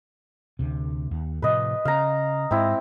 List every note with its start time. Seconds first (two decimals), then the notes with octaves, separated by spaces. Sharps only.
0.59 D2 C3
1.11 D#2
1.42 A2 C3 F3 B4 D#5
1.85 C#3 F5 A#5
2.51 G#2 C4 E4